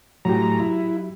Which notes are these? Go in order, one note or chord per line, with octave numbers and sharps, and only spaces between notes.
A2 F#3 G4 A#5
E4